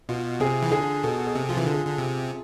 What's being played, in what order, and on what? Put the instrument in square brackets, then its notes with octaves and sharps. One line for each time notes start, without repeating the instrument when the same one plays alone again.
[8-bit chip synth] B2 [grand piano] F4
[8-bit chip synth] C3 [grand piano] G#4
[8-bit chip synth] E3
[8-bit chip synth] D3 [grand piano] G#4
[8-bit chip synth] B2 [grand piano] A4
[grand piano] G#4
[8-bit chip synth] C3
[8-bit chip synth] F3 [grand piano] F4
[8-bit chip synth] E3
D3
[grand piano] G#4
[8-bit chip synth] D3
C3